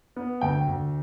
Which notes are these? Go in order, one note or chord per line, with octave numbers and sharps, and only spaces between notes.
B3
D2 G5
D2